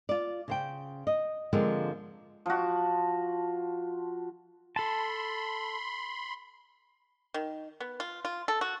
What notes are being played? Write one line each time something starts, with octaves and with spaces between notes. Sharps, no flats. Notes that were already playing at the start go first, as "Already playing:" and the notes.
F4 D5
C#3 C5 G5
D#5
D3 F3 G#3 A#3 C4
F3 F#4
A4 A5 B5 C6
D#3
B3
F4
F4
A4
F#4